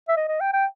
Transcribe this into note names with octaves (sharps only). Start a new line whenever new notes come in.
E5
D#5
D#5
G5
G5